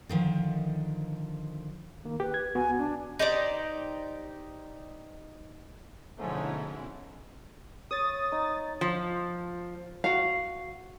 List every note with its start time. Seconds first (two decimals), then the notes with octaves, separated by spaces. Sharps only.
0.09 D3 D#3 F3
2.05 D#3 A#3
2.20 G4 B4
2.34 G#6
2.55 C#2 B3 F#4 G#5
2.78 D4
3.19 D#4 G4 C5 D5
6.18 G#2 B2 D3 F3 A3 C#4 E4
7.91 C#5 D#6 A6
8.32 D#4
8.81 F3
10.04 F#4 F5